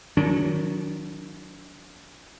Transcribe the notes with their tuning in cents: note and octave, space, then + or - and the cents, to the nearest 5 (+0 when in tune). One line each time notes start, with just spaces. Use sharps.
D#3 +10 F#3 -15 D4 -35